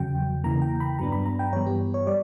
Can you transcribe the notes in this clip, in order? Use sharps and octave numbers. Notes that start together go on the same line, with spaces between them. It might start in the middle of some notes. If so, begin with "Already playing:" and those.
Already playing: E2 C#3 F#3 G5
E2 C#3 E3 A#3 A#5
G5
B5
G2 F#3 B3 D4 A#5
B5
A#5
G5
G2 E3 G3 B3 C#5
G4
C#5
G3 D5